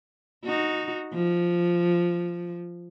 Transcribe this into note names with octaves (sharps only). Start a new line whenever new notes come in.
D#4 F#4
F3